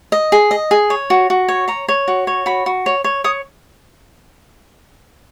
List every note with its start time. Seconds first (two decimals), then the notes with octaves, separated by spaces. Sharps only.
0.12 D#5
0.32 G#4
0.51 D#5
0.71 G#4
0.90 C#5
1.10 F#4
1.30 F#4
1.48 C#5
1.68 C#5 A#5
1.88 C#5
2.08 F#4
2.27 C#5
2.46 F#4 B5
2.66 F#4
2.86 C#5
3.04 C#5
3.24 C#5 D#6